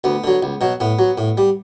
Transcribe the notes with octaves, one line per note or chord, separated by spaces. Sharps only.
D2 B3
D3 F#3
C#2
B2 F#3
A2 B3
F#3
A2
G3